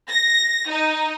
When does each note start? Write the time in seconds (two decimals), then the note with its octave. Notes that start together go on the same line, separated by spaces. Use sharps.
0.11 A#6
0.70 D#4